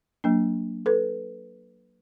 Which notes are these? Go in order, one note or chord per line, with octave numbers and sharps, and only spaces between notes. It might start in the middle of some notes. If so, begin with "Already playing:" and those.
F#3 A#3 D4
A4 B4